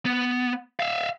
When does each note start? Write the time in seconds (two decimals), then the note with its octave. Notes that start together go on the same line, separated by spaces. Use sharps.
0.06 B3
0.80 E5 F5